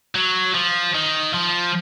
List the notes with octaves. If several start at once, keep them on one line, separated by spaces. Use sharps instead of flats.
F#3
F3
D#3
F3